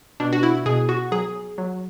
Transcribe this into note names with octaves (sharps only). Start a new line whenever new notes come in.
B2 D4
F#4
E4
B2 G#4
F#4
F#3 G#4
F#3